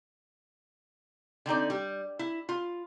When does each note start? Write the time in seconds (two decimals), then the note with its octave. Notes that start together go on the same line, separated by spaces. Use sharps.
1.46 D3 C4 D#4 D5
1.70 G3
2.19 E4
2.49 F4